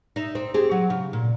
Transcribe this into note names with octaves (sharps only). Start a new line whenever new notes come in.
D#4 E5
C4
C4 G4 G#4
F#3
C#3
A#2